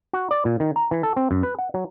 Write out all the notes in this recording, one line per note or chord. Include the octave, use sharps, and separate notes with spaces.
F#4
D5
A#2
D#3
A#5
E3
A4
C4
F#2
B4
F#5
F#3